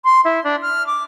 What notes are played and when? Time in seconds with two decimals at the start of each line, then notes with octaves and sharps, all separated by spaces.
0.05 C6
0.25 E4
0.44 D4
0.62 F6
0.87 D6